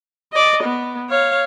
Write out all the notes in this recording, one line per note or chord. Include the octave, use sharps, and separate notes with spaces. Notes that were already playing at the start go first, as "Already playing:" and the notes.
D5 D#5
B3
C#5 F5